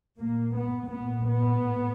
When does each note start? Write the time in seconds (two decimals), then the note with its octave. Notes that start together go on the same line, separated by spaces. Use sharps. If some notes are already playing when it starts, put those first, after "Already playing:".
0.19 A#2 A#3
0.55 B3
0.90 A#2 B3
1.26 B3
1.62 A2